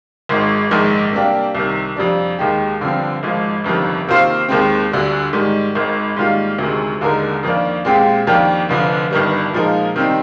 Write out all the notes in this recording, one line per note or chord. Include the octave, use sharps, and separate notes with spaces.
G#1 G#2 D#3 G#3
A#1 G#2 D#3 G#3 D#4
C3 G3 A#3 D4 G4
C2 C3 D#3
F2 C3 G3 D4
D#2 D#3 G#3 D#4 G4
G2 D3 F3 C4
G#1 G#2 F3
G1 F2 C3 D#3
C3 D#3 A#3 F4 C5
D#2 D#3 G#3 C4
D2 D3 G3
G#2 D#3 G3
G#1 G#2 D#3
G#2 D#3 G3 A#3 F4
D2 C3 D#3 G#3
D#2 D3 G#3 D#4 A#4
F2 D#3 A#3 D4
A#2 G#3 C4 G4
F2 D#3 A#3 D4 G4
F1 F2 D3 F3
G1 G2 D#3 G3
A#2 F3 G#3 D#4 A#4
C3 D#3 G3 C4 D#4